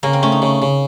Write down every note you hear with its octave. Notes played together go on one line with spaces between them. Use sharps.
C#3 A#3
C4
A3 C#4
D#4
C#3
C#3